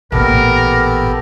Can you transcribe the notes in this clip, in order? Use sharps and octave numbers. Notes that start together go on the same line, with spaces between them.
A1 A#2 B3 G4 A4 A#4